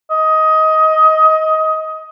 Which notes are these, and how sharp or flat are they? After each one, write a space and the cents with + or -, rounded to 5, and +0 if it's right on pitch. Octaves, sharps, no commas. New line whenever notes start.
D#5 +20